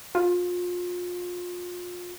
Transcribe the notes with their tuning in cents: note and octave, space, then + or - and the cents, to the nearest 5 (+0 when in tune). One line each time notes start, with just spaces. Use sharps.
F4 +30